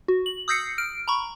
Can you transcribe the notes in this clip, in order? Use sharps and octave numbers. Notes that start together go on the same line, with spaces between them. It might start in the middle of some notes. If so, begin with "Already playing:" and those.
F#4
F#7
D#6 E6 G6 A#6 C7 C#7
F6 D7
A#5 B5 C#6